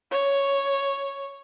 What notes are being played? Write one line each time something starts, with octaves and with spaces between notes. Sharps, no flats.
C#5